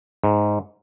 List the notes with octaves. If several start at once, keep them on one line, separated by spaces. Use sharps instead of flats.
G#2